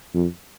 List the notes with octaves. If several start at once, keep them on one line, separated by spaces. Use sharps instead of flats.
F2